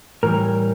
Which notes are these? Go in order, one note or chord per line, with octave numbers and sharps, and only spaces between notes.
A2 E3 G3 A#4